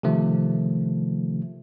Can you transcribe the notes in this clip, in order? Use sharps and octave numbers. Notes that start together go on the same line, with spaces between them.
C3 D#3 F3 A3